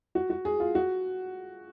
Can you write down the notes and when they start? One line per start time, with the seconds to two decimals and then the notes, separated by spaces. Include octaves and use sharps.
0.15 F#4
0.30 F#4
0.45 G#4
0.60 F4
0.75 F#4